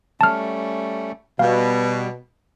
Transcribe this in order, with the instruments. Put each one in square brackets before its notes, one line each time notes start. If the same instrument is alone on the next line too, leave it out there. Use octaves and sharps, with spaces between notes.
[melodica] G3 A3 C#4 [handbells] A5 F6
[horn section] B2 [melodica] G3 [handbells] F5